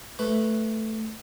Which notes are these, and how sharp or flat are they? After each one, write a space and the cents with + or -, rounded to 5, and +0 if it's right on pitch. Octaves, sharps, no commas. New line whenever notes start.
A3 +0 B4 +0